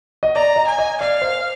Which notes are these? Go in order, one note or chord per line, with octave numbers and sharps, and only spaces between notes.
D#5
D5 A#5
D#5
G#5
D#5
D5 F5
C5